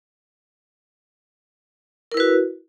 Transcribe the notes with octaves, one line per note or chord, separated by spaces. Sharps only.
E4 F#4 A#4 B4